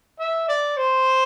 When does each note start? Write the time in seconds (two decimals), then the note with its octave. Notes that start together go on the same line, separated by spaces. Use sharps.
0.19 E5
0.48 D5
0.77 C5